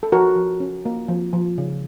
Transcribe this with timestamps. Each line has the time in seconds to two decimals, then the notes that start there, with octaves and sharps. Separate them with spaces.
0.03 A4
0.12 F3 F#4 A#4
0.36 F3
0.60 C#4
0.85 A#3
1.08 F3
1.33 F3
1.58 C#3